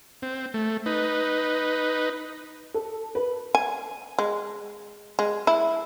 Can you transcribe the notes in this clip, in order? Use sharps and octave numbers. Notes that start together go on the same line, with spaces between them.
C4
A3
D#4 B4
A4
B4
G#5
G#3
G#3
E4